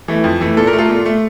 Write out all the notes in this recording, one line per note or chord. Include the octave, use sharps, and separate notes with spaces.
E3 A3
F2
E3 A3
A#2 A4
A#4
A3
F4 A4
A#2
A3